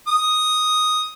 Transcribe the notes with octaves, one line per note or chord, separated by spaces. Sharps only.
D#6